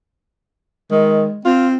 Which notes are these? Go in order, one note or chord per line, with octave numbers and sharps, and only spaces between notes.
D#3 G#3
C4 F4